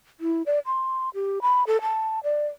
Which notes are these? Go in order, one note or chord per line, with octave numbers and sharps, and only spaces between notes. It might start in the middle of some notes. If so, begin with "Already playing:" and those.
E4
D5
C6
G4
B5
A4
A5
D5